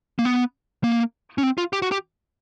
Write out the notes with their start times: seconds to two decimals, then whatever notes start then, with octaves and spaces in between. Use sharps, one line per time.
0.19 A#3
0.25 B3
0.84 A#3
1.38 C#4
1.43 C4
1.58 F4
1.73 G4
1.82 F#4
1.92 G4